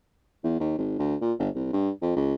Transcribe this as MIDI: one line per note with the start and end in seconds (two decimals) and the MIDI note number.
0.44 0.59 40
0.60 0.77 39
0.78 0.96 32
0.99 1.16 38
1.22 1.33 46
1.39 1.49 31
1.55 1.71 36
1.73 1.90 43
2.02 2.16 41
2.16 2.34 37